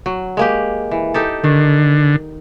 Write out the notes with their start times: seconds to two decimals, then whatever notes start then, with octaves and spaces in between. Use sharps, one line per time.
0.06 F#3
0.37 G#3 A#3 G4
0.91 E3
1.14 D#4 G4 A4
1.44 D3 D#3